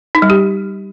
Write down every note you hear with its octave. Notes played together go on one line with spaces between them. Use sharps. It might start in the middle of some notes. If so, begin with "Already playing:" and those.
D#4
G3
G4